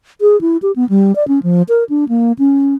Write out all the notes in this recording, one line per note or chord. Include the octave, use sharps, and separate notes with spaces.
G#4
E4
G4
B3
G3
D5
C#4
F3
A#4
D4
A#3
C#4